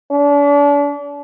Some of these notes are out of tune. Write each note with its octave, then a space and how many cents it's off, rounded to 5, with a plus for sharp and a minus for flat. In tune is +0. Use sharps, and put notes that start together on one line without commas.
D4 -40